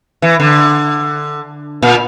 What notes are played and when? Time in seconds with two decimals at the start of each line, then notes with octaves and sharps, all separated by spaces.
0.22 E3
0.40 D3
1.82 A#2